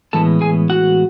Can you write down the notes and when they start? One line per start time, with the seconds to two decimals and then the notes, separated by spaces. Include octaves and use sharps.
0.13 A2 E3 G#3 B3 A4 A5
0.41 G#4 G#5
0.70 F#4 F#5